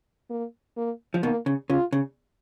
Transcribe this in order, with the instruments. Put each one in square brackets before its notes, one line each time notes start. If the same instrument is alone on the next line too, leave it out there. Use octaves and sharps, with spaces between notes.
[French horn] A#3
A#3
[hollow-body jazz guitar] F3
[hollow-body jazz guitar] B2 D#3 [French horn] A#3
[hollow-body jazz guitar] C#3
[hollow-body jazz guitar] C#3 [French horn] F4
[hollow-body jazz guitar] C#3